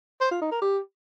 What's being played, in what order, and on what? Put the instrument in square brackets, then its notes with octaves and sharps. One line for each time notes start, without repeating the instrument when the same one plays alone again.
[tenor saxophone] C5
F4
D#4
A#4
G4